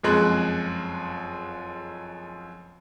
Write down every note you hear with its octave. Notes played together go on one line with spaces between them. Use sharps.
F#1 F2 G#3 F#6